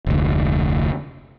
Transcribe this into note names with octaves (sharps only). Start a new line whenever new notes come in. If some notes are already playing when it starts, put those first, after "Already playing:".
F1 D2